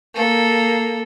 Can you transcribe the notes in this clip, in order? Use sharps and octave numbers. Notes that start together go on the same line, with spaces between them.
A#3 A4